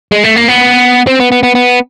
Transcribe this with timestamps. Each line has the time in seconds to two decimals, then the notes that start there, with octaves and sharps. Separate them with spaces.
0.12 G#3
0.24 A3
0.36 A#3
0.48 B3
1.07 C4
1.20 B3
1.32 B3
1.43 B3
1.55 B3